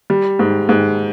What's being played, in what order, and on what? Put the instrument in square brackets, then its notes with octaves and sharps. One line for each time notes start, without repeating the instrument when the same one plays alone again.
[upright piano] G3
G#2
G#2